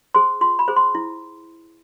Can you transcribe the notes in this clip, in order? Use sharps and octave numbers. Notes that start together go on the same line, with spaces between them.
G#4 C5 C6
F4 C6
B5
G#4 C5
C6
E4